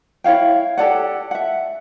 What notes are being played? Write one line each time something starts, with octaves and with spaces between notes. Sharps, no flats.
E4 C#5 F5 G5
G4 A4 D5 F#5
E5 F#5